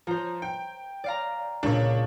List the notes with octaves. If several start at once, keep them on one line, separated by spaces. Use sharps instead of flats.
F3 C5 A#5
G5
D5 F5 A#5
C#2 A#2 D4 C#5